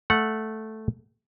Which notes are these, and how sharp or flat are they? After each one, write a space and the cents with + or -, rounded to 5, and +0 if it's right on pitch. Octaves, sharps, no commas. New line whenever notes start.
A3 -5 F#5 -10